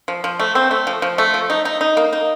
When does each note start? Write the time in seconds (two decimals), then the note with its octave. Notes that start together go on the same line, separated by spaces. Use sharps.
0.08 F3
0.24 F3
0.40 A3
0.55 C4
0.71 A3
0.87 F3
1.02 F3
1.18 A3
1.34 F3
1.50 D#4
1.65 D#4
1.81 D#4
1.97 A#3
2.13 D#4